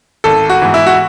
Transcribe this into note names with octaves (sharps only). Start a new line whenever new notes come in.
G#1 A4
F#4
G#2 E3
E4
F#4